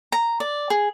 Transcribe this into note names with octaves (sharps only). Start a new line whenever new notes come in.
A#5
D5
G#4